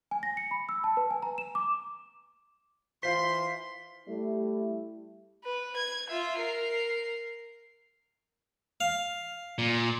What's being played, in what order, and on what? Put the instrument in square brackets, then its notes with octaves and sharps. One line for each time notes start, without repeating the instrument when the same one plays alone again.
[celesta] G#5
A#6
C#7
B5
E6
A5
B4
G#5
A#5
E7
D6
[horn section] E3 C6 [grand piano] F4 C5 [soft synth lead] B6
[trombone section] G3 A3 E4
[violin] B4
G#6
F4 E5
A#4 C7
[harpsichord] F5
[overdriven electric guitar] A#2